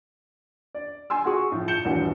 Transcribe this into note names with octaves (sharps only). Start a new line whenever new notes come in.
D5
G#5 C6 E6
F#4 G#4 C#6
A2 F3
G6 C#7 E7 G7
D#1 A#1 E3 F#4